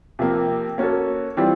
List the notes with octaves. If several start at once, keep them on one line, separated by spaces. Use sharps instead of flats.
C3 F3 A#3
A#3 C#4 F#4 A4
E3 G3 C4 F4